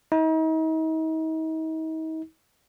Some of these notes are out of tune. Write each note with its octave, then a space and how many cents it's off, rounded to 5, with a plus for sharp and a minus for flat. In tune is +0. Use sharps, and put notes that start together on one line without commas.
D#4 +40